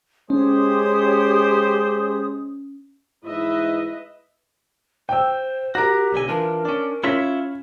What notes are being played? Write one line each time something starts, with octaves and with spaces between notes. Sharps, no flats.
G#3 C#4 G4 C5 C#5 D#6
G#2 E3 E4 B4 D#5 E5
C5 G5 E6
F#4 G4 A#4 A#5 A#6
B1 D3 G#5
E3 D4 F4 A#4
C#4 D4
C#4 E4 F4 C#5 B6